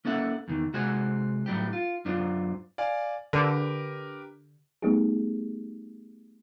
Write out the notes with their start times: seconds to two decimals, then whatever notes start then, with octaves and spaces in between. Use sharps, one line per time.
0.05 A#3 C#4 A4 E5 F#5
0.48 E2 D#3
0.73 C3 G#3 F#4 C5 F#5 G#5
1.46 A2 F#3 G3 G4
1.73 F4
2.05 F#2 F#3 D4 F4 C5
2.78 D5 F5 G#5
3.33 D3 G4 A#4 B4
4.82 G3 A3 B3 D#4 G4 G#4